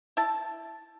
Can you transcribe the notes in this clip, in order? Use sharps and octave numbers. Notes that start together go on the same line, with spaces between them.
E4 A5